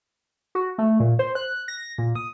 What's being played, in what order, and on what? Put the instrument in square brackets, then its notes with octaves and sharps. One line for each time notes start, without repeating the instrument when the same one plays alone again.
[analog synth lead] F#4
A3
A#2
C5
F#6
A#6
A#2
D#6